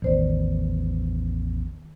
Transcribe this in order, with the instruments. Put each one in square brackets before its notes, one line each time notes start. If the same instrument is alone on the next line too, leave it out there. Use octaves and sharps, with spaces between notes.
[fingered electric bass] A1 E2 [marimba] D#3 C5 D5